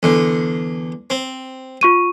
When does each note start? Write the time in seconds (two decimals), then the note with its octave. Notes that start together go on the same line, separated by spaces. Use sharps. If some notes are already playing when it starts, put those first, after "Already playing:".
0.03 E2 D3
1.10 C4
1.81 F4 C#6 D#7